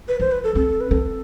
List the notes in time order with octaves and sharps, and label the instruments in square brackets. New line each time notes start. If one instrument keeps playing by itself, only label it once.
[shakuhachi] B4
[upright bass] F3 [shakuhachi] C5
[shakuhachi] B4
A4
[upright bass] C4 [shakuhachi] A4
[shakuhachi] B4
[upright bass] C4 [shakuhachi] A4